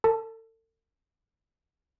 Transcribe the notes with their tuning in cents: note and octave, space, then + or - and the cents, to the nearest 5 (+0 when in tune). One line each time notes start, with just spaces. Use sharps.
A4 +40 A5 +0